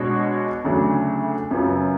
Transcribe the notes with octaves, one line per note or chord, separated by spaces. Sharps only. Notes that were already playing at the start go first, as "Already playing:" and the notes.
Already playing: B2 G#3 D4 F#4 C#5
D2 C#3 F#3 A3 D4
F#2 C#3 F#3 B3 F4